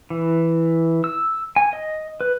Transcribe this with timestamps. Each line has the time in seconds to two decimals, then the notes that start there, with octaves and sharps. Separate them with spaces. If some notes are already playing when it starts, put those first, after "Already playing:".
0.10 E3
1.04 E6
1.56 G#5
1.73 D#5
2.21 B4